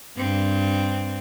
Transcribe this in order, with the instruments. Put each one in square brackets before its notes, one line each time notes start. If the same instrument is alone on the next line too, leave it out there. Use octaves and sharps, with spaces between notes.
[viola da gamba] G2 C4